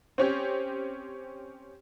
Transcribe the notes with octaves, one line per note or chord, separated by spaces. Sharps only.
C4 C#4 G4